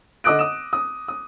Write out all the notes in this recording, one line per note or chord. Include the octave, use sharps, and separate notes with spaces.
D3 D#5 D6 E6 F#6 D7
D#6 E7
D#6
D#6